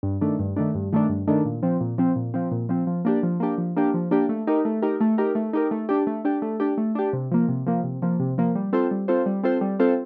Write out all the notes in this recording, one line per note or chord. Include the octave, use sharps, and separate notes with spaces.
G2
D#3 A3 D4
G2
D#3 A3 D4
G2
D#3 A3 D4
G2
D#3 A3 D4
A#2
F3 C4
A#2
F3 C4
A#2
F3 C4
A#2
F3 C4
F3
A#3 D4 G4
F3
A#3 D4 G4
F3
A#3 D4 G4
F3
A#3 D4 G4
A3
D#4 G4 A#4
A3
D#4 G4 A#4
A3
D#4 G4 A#4
A3
D#4 G4 A#4
A3
D4 G4
A3
D4 G4
A3
D4 G4
A3
D4 G4
C3
F3 A#3
C3
F3 A#3
C3
F3 A#3
C3
F3 A#3
G3
C4 F4 A4 C5
G3
C4 F4 A4 C5
G3
C4 F4 A4 C5
G3
C4 F4 A4 C5